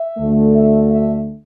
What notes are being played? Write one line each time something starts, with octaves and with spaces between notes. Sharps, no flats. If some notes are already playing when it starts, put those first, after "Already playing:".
Already playing: E5
D2 D3 A3
E5
E5